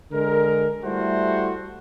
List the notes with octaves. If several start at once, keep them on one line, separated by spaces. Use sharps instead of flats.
D3 G#3 A#4
G3 A3 E4 F#4 C5